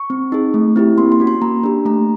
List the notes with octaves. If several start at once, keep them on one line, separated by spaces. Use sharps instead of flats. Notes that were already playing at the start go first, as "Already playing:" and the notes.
Already playing: C#6
C4
D#4 G#4
A3
C4 E4 G4
A#3 C6
C6
C#4 F#4
C6
A#3 A#5
D4 G4
A3 A#5